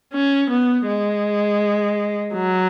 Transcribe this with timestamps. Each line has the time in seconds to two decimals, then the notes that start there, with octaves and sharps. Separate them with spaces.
0.14 C#4
0.50 B3
0.87 G#3
2.34 F#3